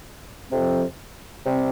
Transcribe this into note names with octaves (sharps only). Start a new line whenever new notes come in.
F2 C3 F3 C4
C3 G3 C4